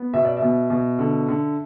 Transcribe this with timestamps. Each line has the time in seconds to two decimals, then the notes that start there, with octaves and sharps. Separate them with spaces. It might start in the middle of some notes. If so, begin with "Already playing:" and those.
Already playing: B3
0.14 B2 E5
0.25 D5
0.37 E5
0.42 B2
0.70 B2
0.99 D3
1.29 D3